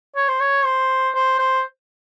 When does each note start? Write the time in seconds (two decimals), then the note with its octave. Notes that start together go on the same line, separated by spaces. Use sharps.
0.16 C#5
0.28 C5
0.40 C#5
0.65 C5
1.14 C5
1.39 C5